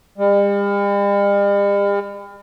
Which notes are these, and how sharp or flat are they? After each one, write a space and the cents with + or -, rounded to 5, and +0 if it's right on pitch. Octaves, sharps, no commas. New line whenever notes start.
G3 +45